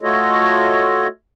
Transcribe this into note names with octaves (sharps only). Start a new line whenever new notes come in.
A3 F4 F#4 A4 C#5 D#5